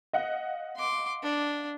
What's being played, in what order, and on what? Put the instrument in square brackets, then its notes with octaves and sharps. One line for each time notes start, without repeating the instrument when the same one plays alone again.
[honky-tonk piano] D#5 F5 F#5
[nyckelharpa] C6 D6
D4